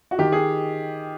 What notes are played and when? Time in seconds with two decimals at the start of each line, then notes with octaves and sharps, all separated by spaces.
0.11 F#4
0.19 D#3 G4
0.32 G#4